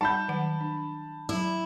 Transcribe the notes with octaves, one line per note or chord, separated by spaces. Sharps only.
G3 D#4 F#5 A5 B5 G6
D#3 F#3 F#5
D4
F#3 E4